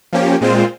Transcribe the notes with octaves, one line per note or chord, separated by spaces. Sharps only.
F3 A#3 C#4 G4
A#2 G#3 C4 F4 C5